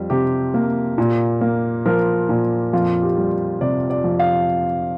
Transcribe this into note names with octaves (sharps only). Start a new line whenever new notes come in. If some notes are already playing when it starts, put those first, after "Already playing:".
Already playing: F2 G3
C3 G4
A#3
A#2
A#3
F3 A#4
A#2
F2 F4
G4
G3
C3 D5
D5
F2
F5